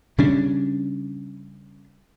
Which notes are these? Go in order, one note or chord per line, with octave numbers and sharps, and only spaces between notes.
C#3 G3 C#4 D4